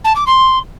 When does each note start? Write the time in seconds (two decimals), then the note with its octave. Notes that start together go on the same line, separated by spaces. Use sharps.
0.04 A5
0.16 D6
0.27 C6